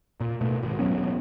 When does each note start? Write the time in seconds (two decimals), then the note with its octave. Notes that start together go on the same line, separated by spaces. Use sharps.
0.20 A#2
0.41 B2 A3
0.63 G#1
0.79 E1 F#3 B3 C#4